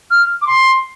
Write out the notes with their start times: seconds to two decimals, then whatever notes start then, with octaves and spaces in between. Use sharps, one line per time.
0.11 F6
0.42 D6
0.47 C6